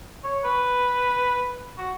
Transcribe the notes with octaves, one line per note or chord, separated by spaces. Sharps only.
C#5
B4
F#4